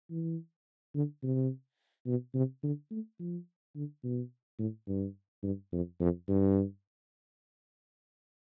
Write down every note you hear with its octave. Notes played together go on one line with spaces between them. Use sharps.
E3
D3
C3
B2
C3
D3
A3
F3
D3
B2
A2
G2
G2
F2
F2
G2